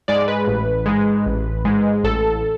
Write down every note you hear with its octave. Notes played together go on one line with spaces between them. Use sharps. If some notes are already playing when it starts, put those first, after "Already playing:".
G#2 G#3 D5
B4
A1
G#2 G#3
A1
G#2 G#3
A1 A4